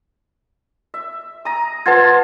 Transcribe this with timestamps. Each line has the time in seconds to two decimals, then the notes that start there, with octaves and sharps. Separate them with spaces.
0.94 E5
1.45 A#5 D#6
1.86 F4 B4 C5 F#5 A5 G#6